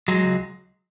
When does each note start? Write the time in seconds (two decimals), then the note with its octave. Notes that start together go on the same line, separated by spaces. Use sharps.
0.08 F#3 G#3
0.23 C#2